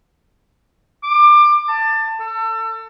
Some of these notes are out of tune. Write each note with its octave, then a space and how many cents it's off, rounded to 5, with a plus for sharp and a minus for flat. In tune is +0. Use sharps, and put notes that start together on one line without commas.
D6 +25
A5 +25
A4 +30